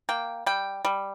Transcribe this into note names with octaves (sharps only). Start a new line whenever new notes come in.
A#3 G5
G3 G5
G3